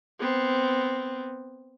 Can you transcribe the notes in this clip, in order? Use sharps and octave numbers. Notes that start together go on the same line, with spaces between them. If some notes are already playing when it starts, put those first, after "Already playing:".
B3 C4